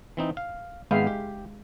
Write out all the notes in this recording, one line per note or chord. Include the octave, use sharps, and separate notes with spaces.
E3 C4 D#4
F5
G#1 G#3 B3 E5 F5 G5
G4